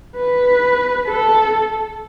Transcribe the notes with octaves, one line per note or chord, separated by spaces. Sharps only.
B4
A4